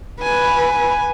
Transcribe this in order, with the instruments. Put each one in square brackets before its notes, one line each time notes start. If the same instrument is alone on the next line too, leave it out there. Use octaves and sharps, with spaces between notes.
[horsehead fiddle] B4 [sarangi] G#5